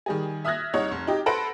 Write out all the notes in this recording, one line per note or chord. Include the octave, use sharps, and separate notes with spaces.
D#3 G3 G#4
E5 D#6 F6 F#6 G#6 A#6
C2 D#4 C#5 G#6
F1
D#4 G4
A4 B4 C5 F#5 A#6 D7